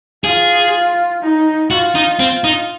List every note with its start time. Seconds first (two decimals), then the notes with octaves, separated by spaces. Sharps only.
0.24 F4 G#4
1.22 D#4
1.71 F4 F#4
1.95 D#4
2.20 C4
2.44 D#4